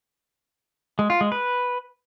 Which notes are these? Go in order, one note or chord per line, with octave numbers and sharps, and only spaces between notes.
G#3
F4
G#3
B4